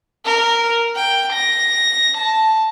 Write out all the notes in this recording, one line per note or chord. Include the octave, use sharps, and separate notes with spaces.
A#4
G5
A#6
A5